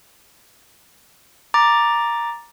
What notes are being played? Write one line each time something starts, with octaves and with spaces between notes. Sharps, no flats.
A#5 D6 A6